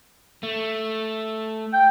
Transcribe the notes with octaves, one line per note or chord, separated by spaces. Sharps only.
A3
G5